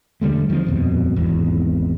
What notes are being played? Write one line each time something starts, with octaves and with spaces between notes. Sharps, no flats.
E1 D3 G3 A3
D#3 F3 A3 C4
D#1 F2 B2
G#1 E2